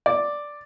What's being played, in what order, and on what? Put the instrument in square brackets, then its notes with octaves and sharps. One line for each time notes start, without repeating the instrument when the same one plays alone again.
[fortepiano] D5